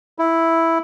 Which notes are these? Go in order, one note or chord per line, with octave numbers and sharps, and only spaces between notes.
E4